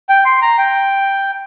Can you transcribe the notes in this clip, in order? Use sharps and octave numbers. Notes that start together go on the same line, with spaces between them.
G5
C6
A#5
G5